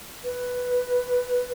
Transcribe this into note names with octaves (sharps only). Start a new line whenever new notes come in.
B4